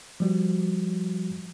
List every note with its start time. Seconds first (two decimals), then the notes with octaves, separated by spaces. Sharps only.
0.20 F3 G3 F#4